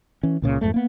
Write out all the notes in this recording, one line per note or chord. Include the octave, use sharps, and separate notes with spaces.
E3 C#4
C#2 A#2 C#3
F2 G#2 A3
A#3 B3